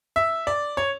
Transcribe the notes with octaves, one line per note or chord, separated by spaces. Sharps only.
E5
D5
C#5